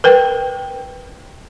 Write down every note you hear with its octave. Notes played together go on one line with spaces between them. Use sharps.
A#4 B4 G5